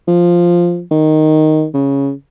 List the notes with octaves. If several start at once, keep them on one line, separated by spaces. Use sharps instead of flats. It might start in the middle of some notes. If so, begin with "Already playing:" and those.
F3
D#3
C#3